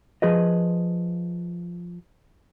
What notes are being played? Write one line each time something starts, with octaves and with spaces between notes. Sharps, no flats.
F3 G#4 B4 D#5